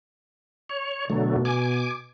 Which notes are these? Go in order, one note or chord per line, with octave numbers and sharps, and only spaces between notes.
C#5
B2 D3 F#3 A3
G#5 D6